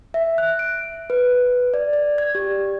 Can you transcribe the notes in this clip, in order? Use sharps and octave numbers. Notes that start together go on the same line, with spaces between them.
E5
F#6
D7
B4
D5
D5
G#6
G4